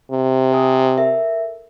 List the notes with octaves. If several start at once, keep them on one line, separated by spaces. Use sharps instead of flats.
C3
C5 G#5 D#6
A4 A#4 E5